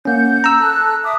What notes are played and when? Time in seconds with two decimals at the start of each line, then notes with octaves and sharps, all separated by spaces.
0.05 A#3 C#4 F#5 G6
0.44 A#5 E6
0.59 A4 A5 F#6
1.04 E5 D6 D#6